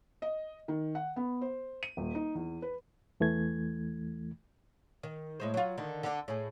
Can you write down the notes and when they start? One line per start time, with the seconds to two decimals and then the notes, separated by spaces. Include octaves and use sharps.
0.22 D#5
0.68 D#3
0.95 F#5
1.16 B3
1.41 C5
1.83 D#7
1.97 D#1
2.15 D#4
2.35 E2
2.62 B4
3.20 E2 E3 A3 G#6
5.03 D#3
5.40 A2 G#3 C5
5.54 F#3 F4
5.78 D3 D#3
6.03 D3 D4
6.28 A2 G#4